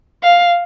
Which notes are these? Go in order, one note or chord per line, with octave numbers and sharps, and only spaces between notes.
F5